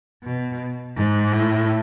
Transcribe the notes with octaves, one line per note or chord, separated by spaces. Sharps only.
B2
G#2
A2